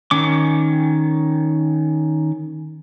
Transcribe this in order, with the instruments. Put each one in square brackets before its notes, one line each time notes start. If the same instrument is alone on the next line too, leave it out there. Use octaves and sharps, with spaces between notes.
[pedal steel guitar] D#3 C#4 D6